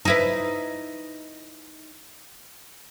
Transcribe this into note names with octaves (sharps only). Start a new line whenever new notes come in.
D#4 E4 B4